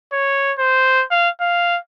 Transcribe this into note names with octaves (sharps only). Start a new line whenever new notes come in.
C#5
C5
F5
F5